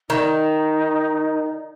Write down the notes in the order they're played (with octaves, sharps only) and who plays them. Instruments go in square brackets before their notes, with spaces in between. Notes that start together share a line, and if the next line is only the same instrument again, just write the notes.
[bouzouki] D#3 [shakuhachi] D#4